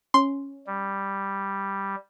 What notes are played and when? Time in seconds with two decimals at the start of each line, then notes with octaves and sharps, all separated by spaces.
0.14 C#4 C6
0.66 G3